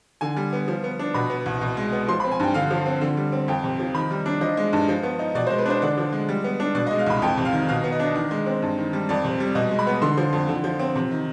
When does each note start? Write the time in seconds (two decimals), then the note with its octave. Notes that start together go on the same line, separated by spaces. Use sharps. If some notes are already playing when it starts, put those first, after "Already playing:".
0.21 D3 G#5
0.37 G3
0.53 B3
0.68 F3
0.84 B3
0.99 D4
1.14 B2 B5
1.30 B3
1.46 C2
1.61 B2
1.77 G#3
1.92 B3
2.08 F3 C6
2.20 B5
2.24 C4
2.32 G#5
2.40 G2 G5
2.54 D3 F5
2.71 F3
2.86 C4
3.01 D3
3.17 G3
3.32 C4
3.48 F2 G5
3.64 C3
3.79 F3
3.95 D#3 B5
4.11 G3
4.26 D4
4.41 F3 D#5
4.57 G#3
4.73 G2
4.88 F3
5.03 B3
5.19 D#4
5.35 B2 D5
5.47 C5
5.50 G#3
5.58 B4
5.66 D4 C5
5.82 D3 D5
5.98 F3
6.13 G#3
6.29 G3
6.44 B3
6.60 D4
6.75 B2 D5
6.87 D#5
6.91 G#3
6.99 F5
7.07 C2 B5
7.22 F2 G5
7.37 C3
7.45 F5
7.53 D#3
7.68 B2 F5
7.84 B3
7.92 D#5
8.00 D4
8.15 D#3
8.31 G#3
8.46 C4
8.62 G2
8.78 D#3
8.93 G3
9.09 F2 D5
9.24 C3
9.40 G3
9.55 B2 D#5
9.71 G#3
9.79 B5
9.87 B3
10.02 D3 C6
10.17 F3
10.33 F2
10.49 D3
10.64 F3
10.79 C4
10.95 C3
11.11 D#3